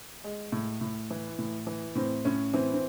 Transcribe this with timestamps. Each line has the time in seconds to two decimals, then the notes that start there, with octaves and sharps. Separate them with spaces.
0.24 G#3
0.52 A2
0.81 A2
1.11 E3
1.39 A2
1.67 E3
1.95 A2 C4
2.25 A2 C#4
2.53 E3 C4
2.74 C4